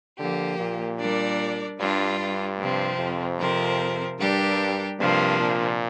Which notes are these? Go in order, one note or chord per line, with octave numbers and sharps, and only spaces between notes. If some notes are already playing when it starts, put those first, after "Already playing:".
D3 F3 A#3 G4
A#2
G3 D4 A#4 D5
G2 G3 D4 F4
G2
C3 F3 C4
F2
C3 F3 C4 A#4
G2 G3 D4 G4 A#4
G2 C3 F3 A#3 D4
A#2